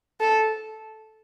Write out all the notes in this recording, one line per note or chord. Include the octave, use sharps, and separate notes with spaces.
A4